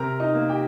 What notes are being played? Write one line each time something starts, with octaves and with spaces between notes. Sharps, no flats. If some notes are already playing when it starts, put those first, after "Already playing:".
Already playing: C3 A#4 A#5
D#4 D#5
A#3
G4 G5